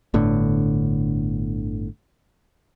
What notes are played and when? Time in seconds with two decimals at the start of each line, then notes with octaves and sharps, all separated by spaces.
0.14 G1 A2 D3